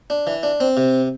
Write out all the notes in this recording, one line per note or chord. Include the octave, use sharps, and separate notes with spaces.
D4
E3
D4
C4
C3